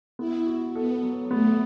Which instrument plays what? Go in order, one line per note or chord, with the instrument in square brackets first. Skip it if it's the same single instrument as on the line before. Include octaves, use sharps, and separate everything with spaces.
[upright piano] B3 [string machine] E4
[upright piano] F#4
[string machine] B3 [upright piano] A4
[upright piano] F#3
[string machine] A3 [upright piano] B3